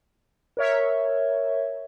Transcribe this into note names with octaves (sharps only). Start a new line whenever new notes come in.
A#4 C#5 E5